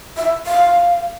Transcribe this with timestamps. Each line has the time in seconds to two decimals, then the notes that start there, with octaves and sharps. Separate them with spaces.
0.17 E5
0.46 F5